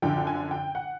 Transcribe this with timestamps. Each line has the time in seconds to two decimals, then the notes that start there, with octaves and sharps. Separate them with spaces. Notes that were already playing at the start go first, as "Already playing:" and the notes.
0.02 F#2 D3 F3 G5
0.27 G#5
0.51 G5
0.75 F#5